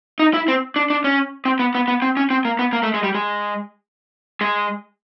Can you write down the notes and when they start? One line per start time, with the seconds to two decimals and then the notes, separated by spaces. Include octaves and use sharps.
0.19 D#4
0.34 E4
0.48 C4
0.76 D4
0.90 D4
1.04 C#4
1.45 C4
1.59 B3
1.75 B3
1.88 B3
2.02 C4
2.17 C#4
2.30 C4
2.45 A#3
2.59 B3
2.73 A#3
2.83 A3
2.94 G#3
3.03 G3
3.15 G#3
4.41 G#3